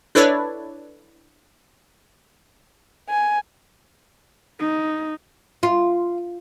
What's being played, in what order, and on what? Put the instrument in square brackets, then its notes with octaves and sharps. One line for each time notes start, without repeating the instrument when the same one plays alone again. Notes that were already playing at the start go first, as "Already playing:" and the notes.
[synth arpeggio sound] D4 E4 A4 B4 C#5 D5
[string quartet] G#5
[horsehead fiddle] D#4
[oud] F4